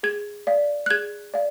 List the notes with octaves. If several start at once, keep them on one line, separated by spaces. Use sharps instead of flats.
G#4 G#6
D5 F5
F#6
G#4 G#6
D5 F5